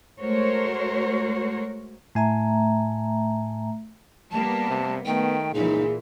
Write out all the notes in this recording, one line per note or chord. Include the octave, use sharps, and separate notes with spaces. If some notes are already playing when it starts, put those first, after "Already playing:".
G#3 A3 F#4 A#4 C5 C#5
A2 A3 E5 G#5 A#5
G3 A#3 B3 A5
C3
D#3 A3 B3 G5
C#2 A#2 E3 D#4 G#4